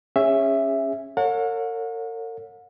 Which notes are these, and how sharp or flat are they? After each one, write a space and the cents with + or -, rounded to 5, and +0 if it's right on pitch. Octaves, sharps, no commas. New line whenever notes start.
C#4 -10 G#4 -30 E5 +5
A#4 -45 C#5 +0 F#5 -40